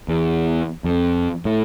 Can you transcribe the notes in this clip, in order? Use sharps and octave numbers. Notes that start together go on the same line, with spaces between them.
E2
F2
A2